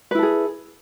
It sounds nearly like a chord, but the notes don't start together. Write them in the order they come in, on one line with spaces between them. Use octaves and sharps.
B4 E4 A4 G#4